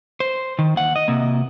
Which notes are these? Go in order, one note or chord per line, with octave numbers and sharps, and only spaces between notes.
C5
D#3
D#2 F#5
D#5
C3 A#3